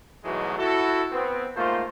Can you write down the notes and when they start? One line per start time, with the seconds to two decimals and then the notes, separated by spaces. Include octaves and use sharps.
0.24 G#2 B2 E3 F#3 G#3 A3
0.58 E4 F#4 A4
1.12 B3 C4
1.56 G#2 A3 A#3 F4 C5